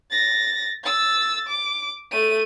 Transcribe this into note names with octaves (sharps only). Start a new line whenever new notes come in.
A6 A#6
E6 A6
D6
A3 D#7